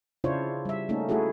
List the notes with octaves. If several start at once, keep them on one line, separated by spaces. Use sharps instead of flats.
C#3 D4 E4 F4 C5 C#5
G3 E5
A3 A#3 C#4 D#4 A4
A3 E4 F#4 G#4 A4